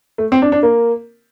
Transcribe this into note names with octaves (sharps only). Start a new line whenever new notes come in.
A3
C4
D4
D4
A#3